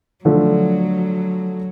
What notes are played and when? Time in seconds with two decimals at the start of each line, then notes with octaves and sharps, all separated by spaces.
0.25 D3 F3 F#3 A3